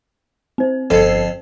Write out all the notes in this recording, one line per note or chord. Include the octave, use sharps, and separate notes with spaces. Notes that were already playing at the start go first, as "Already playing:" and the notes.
C4 C5
G1 F2 A4 C5 C7